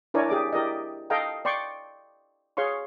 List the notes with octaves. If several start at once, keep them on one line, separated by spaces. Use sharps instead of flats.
D4 E4 A#4 C#5 D5 G#5
G4 G#4 D5 D6
E4 G4 A#4 D5 D#5
A4 D#5 F5 G5 A#5
D5 G5 C6 C#6
G#4 C#5 F5 C6 C#6